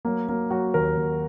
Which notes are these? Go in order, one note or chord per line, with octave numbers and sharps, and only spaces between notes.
F#3 A#3
F#3 A#3
F#3 F#4
D#2 A#4
D#2